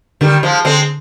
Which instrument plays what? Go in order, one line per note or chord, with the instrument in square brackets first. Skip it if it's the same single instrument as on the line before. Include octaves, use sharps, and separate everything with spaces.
[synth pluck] D3 [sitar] D#3 G3
[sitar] F3 G#3
[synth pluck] D3 [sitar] G#3 C4